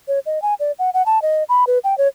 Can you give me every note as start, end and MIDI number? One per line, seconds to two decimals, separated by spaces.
0.08 0.19 73
0.26 0.41 75
0.42 0.54 80
0.60 0.72 74
0.79 0.90 78
0.94 1.05 78
1.06 1.21 81
1.22 1.44 75
1.49 1.64 83
1.67 1.79 71
1.84 1.97 79
1.98 2.08 73